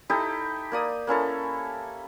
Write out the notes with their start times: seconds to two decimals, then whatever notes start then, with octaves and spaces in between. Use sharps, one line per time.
0.10 D#4 E4 G4 A4
0.72 A#3 D5 D#6
1.07 A#3 C#4 E4 A4